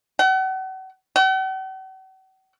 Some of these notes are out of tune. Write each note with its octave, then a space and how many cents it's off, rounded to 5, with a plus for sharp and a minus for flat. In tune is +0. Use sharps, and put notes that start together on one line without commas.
F#5 +40
F#5 +45